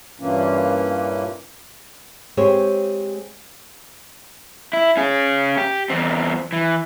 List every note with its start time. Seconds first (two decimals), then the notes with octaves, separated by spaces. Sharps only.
0.20 G2 A#2 E3 A#3 C#4
2.37 G#3 C4 G4 C5 C#5
4.73 E4
4.97 C#4 G#4
5.57 G4
5.90 E2 C4
6.53 E3